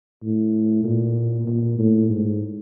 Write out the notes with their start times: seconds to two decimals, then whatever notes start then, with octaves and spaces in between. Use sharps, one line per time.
0.23 A2
0.84 A#2
1.47 A#2
1.79 A2
2.09 G#2